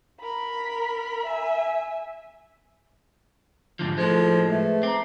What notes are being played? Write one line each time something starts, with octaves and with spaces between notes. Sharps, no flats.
A#4 B5
E5 G#5
G#2 D3 F3
A2 F3 G#3 F4 A4
A3 G#4 B4
C4 A#5 D6